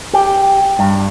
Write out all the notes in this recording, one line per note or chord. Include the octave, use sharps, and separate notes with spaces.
G4
G2